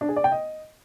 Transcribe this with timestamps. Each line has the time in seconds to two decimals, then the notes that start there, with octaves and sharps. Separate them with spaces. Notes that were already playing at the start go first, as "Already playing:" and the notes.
0.01 D4
0.09 G#4
0.16 D5
0.24 G5
0.32 D#5